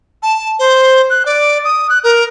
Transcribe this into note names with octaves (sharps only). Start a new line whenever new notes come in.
A5
C5
F#6
D5
D#6
F#6
A#4